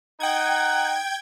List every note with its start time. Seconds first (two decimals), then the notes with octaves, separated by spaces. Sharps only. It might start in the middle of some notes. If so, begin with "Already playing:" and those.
0.20 D#4 F#5 G5 G#6